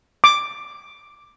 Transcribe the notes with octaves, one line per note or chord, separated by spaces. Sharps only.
D6